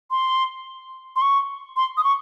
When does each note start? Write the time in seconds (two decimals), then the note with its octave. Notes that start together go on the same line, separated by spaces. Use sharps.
0.11 C6
1.16 C6
1.22 C#6
1.76 C6
1.97 D#6
2.04 C#6